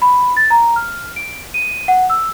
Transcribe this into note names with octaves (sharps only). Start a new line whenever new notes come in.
B5
A6
A#5
F6
D7
D#7
F#5
E6